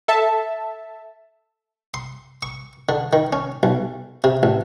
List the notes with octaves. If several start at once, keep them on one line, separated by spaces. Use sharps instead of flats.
A4 E5 A5
C6
C#6
D3
D#3
C#4
B1
C3
A1